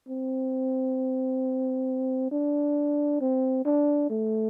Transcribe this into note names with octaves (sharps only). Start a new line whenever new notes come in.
C4
D4
C4
D4
A3